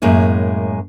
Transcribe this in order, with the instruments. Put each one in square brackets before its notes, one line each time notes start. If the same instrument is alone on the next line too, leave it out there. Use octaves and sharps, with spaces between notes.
[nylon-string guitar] F#2 A2 G#3 A#3 E4